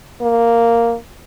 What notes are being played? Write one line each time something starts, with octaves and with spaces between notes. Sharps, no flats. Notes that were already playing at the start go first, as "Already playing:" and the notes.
A#3